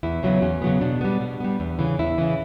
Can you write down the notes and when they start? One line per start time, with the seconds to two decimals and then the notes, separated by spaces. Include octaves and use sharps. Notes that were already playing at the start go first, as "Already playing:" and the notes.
0.03 E2 E4
0.23 C#3 F#3 B3
0.42 E2 C#4
0.62 C#3 F#3 B3
0.81 B2 D4
1.01 G3 B3
1.20 B2
1.40 G3 B3
1.60 E2
1.79 C#3 E3
1.99 E2 E4
2.18 C#3 E3